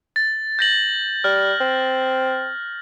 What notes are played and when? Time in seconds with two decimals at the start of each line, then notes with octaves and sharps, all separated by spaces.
0.16 A6
0.59 G6 A#6 F#7
1.24 G3 F6
1.61 C4